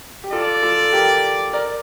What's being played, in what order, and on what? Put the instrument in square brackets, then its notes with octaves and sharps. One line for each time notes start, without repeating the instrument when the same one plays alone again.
[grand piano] G4
[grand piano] F4 A4 [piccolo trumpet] D5
[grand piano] F4 A4
A4
G4 A#4
A#4 D5